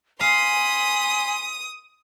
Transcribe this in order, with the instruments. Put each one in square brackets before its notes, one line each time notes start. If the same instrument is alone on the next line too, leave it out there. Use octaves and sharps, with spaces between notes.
[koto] F5 [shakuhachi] G#5 [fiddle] B5 C6 [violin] D#6